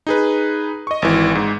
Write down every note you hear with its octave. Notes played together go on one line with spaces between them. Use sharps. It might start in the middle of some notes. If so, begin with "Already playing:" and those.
D#4 G#4 B4
D#5 C#6
G#1 E3
G#2